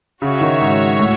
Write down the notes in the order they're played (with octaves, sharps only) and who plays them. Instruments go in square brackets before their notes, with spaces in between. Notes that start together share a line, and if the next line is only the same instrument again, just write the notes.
[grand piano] C#3 [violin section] F#4 C#5 E5
[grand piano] D#3
G#2
A2